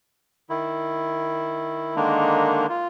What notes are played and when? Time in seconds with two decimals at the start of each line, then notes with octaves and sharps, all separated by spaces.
0.50 D#3 E4
1.96 D3 D#3 G#3 A#3 D4 D#4
2.69 F4